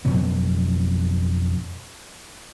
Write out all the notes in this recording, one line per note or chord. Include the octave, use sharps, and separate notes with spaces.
F2 B2 F#3 B3